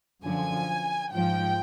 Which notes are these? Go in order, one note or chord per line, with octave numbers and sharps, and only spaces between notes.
F#2 D3 F3 G#5
G#2 F3 G5